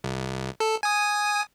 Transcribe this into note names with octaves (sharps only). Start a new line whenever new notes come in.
C2
A4
G#5 D#6